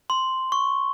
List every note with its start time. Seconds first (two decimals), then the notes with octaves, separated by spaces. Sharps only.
0.10 C6
0.52 C#6